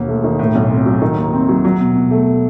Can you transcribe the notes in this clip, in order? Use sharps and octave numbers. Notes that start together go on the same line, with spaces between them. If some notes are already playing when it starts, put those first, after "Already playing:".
Already playing: E1 D#2
A3
D#3
A2
B1
C4
F#3
D#3
D#2
C4
F#3
F#3
B2
B2
A3